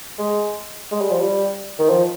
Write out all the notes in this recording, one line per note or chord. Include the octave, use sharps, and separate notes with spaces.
G#3
G#3
G3
F3
G3
D#3
F3